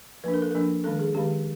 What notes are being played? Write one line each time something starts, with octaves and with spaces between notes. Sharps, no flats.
F3 A#3 D4 B4
A#4
A4
F3 A#3 D4 A#4
D#3 G#3 C#4 A4
G#4
D#3 G#3 C#4 G4